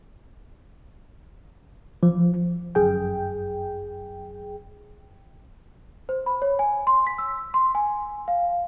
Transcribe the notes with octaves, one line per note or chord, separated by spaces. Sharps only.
F3
G1 F#2 G#4 G5
C5
B5
C#5
G#5
C6
B6
E6
C6
G#5
F5